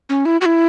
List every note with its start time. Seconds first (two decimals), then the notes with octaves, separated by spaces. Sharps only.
0.09 C#4
0.25 E4
0.41 F#4
0.46 E4